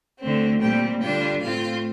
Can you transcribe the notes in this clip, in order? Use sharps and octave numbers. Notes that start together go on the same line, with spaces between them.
D2 D3 A3 C4
A#2 G3 C4 G5
D3 G3 D4 F4 G5
A2 A3 C4 F4 F5